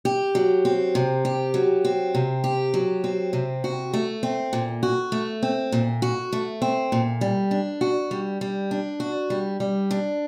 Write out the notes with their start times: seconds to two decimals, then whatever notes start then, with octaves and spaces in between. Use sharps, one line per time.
0.05 G4
0.35 F#3
0.65 C4
0.95 C3
1.25 G4
1.54 F#3
1.85 C4
2.15 C3
2.44 G4
2.74 F#3
3.04 C4
3.33 C3
3.64 F#4
3.93 A3
4.23 C4
4.53 A#2
4.83 F#4
5.12 A3
5.43 C4
5.72 A#2
6.02 F#4
6.33 A3
6.62 C4
6.92 A#2
7.21 G3
7.51 D4
7.81 F#4
8.11 G3
8.41 G3
8.71 D4
9.00 F#4
9.30 G3
9.60 G3
9.91 D4